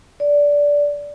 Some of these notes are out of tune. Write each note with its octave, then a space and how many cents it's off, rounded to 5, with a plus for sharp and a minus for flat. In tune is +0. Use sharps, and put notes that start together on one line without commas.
D5 -15